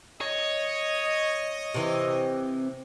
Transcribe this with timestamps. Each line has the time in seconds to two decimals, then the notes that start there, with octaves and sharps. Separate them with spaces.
0.21 C#5 D#5
1.74 C3 E3